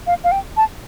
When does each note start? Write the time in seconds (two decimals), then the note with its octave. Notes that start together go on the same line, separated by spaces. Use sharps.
0.07 F5
0.24 F5
0.32 G5
0.57 A5